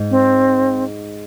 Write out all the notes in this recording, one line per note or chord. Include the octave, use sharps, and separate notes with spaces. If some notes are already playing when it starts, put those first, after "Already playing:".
Already playing: G#2
C4